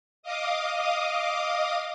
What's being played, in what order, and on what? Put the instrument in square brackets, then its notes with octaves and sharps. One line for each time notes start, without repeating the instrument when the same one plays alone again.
[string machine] D#5 F5 D6 D#6